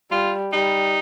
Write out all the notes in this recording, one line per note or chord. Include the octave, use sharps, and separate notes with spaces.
G3 F4
G3 D#4